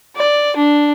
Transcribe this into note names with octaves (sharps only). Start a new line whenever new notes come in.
D5
D4